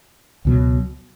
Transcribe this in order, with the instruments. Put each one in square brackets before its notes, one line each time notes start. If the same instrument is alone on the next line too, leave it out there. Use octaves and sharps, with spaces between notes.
[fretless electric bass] C#2 B2 F#3